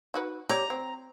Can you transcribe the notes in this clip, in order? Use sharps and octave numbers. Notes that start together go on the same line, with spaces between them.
D#4 F#4 B4
G4 C#5 D5 A#5
C4